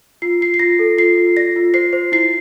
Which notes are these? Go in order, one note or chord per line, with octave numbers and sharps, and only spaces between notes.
F4 C7
F4 C7
C7
F4 A#6
A4
F4 C7
F4
D5 A#6
F4
C5 C7
C5
E4 C7